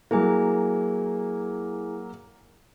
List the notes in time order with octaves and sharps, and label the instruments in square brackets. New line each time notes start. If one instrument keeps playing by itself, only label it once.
[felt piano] F#3 A#3 [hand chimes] E4 G#4 G#5